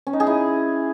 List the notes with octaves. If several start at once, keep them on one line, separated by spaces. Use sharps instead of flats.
C#4
D#4
G#4
E4